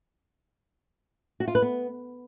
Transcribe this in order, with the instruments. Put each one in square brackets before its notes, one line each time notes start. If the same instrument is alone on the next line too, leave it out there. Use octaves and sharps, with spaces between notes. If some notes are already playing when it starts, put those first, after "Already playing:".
[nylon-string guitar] F#4
F4
B4
B3